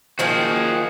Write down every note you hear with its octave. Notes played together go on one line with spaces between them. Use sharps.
D#3 F3 A#3 F#4 G#4